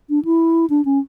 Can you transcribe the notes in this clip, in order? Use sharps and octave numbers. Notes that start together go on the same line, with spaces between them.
D4
E4
D4
C#4